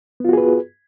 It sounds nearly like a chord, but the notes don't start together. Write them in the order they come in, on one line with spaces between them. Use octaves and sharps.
B3 F4 F#4 G#4 B4